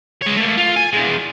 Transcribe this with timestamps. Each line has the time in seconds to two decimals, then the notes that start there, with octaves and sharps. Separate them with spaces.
0.22 G#3 C#5
0.37 A3 A#3
0.58 F4
0.76 G#5
0.93 E2 G#3